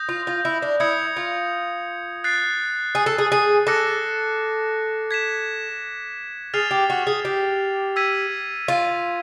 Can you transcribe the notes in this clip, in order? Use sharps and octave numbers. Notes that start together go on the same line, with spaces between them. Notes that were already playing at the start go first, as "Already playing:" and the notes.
Already playing: D#6 G6 A#6
F4
F4
E4
D4
E4 D#6 G#6 C#7
F4
F#6 A6 C7
G#4
A4
G#4
G#4
A4 D6 F#6 A#6 C#7
G#6 B6 E7
G#4 F6 A6 C7 F7
G4
F#4
G#4
G4
E6 G#6 B6 D#7
F4